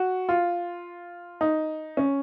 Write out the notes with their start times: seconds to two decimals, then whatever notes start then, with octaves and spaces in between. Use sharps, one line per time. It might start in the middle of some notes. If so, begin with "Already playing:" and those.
Already playing: F#4
0.29 F4
1.41 D#4
1.97 C#4